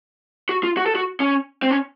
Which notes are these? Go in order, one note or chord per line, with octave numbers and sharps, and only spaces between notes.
F#4
F4
F#4
A4
F#4
C#4
C4
C#4